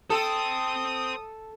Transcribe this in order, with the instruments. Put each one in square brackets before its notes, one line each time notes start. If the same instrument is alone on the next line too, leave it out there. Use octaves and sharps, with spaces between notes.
[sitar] A4 [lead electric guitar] C5 G5 [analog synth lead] D#6